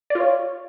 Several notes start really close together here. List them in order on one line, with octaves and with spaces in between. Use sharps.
D5 F4 C#5